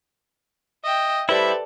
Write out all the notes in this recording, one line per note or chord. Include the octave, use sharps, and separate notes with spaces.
D#5 E5 G5
G3 E4 G4 A4 B4 C5 D5 E5